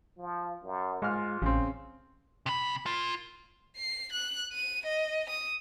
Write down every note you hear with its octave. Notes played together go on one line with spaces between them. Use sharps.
F3
F#2
G#2 G#3 F4 F6
A1 C#3 C4
C3 B5
F4 A#4
C7
F#6
D#7
D#5
D#6